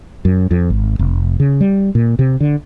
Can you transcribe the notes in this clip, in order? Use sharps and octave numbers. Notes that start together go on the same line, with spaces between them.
F#2
F2
G#1
F1
C#3
G3
A#2
C3
D3